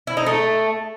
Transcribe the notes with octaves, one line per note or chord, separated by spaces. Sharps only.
E4
D#4
A3